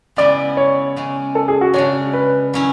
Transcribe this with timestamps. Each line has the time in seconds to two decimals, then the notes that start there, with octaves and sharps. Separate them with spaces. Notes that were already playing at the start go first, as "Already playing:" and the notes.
0.16 C#3 G#3 B3 E4 D5
0.57 C#5
0.96 C#3 G#3 C#4
1.35 A4
1.48 G#4
1.61 F#4
1.74 C#3 G#3 D4 C#5
2.13 B4
2.54 F#3 C#4 E4